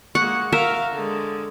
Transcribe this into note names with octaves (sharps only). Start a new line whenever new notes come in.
G#3 A#3 F#5 C#6 C#7
A#4 E5 F5
D3 G#3